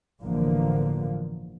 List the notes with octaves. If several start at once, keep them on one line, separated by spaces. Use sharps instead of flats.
G1 A2 D3 E3 F3 A#3